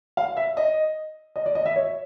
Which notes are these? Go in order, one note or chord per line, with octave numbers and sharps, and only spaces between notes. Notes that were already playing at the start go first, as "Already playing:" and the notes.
F5
E5
D#5
D#5
D5
D#5
E5
C#5